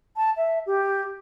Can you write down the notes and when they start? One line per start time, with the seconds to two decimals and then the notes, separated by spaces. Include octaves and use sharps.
0.17 A5
0.37 E5
0.66 G4